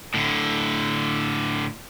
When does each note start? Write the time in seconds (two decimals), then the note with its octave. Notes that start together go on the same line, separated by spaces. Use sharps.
0.14 A2 D3